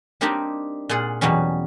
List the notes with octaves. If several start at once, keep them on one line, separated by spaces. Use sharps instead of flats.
G3 A#3 C4 D4 D#4 G4
A#2 F4 G#4 F#5
E2 B2 F#3 G3 C#4